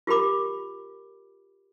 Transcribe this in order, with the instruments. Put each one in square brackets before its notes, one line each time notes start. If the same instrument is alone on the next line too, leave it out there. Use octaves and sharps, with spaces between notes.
[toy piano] F4 G4 A#4 B5 D6